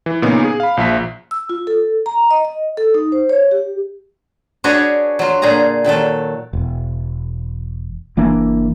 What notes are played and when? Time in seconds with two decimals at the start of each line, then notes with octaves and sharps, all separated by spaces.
0.06 E3
0.22 A#2 C#3 B3 C#4 D#4
0.44 G#4
0.60 F5 B5
0.77 A#1 F3 E5 B6
1.31 E6
1.49 F4
1.67 A4
2.06 A#5
2.31 D#5
2.45 D#5
2.77 A4
2.94 D#4
3.12 C5
3.29 C#5
3.51 G4
4.64 D4 F#4 G#4 B4 C#5 D#5
5.19 F#3 F4
5.42 A#2 D3 G#4 A#5
5.85 A#2 D#3 F#3 A4
6.53 E1
8.17 F#1 E3 A#3 D4